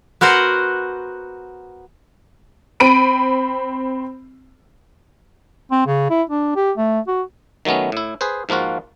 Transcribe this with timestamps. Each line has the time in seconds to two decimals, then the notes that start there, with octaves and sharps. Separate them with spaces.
0.21 B3 F#4 A#4 C5 F#5
2.80 C4 B5 D7 D#7
5.72 C4
5.86 C#3
6.10 E4
6.30 D4
6.56 G4
6.77 A3
7.07 F#4
7.65 D#3 F#3 A3 B3 C#4
7.92 A2 E4
8.21 G#4 B4 C5
8.49 G#2 F3 A#3 F4 F#4